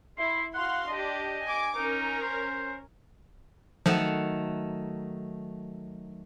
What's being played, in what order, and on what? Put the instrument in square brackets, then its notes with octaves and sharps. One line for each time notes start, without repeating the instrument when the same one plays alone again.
[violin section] E4 [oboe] C6
[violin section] F#4 F5 C6 [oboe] F#5
[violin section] D4 G4 [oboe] D#5
[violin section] G#5 D6
[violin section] C#4 A#4 [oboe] D#4
[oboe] C5
[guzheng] D#3 A3 F#5 [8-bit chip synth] F3 [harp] F#3